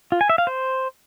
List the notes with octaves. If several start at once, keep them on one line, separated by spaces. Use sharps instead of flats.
F4
G#5
E5
F5
C5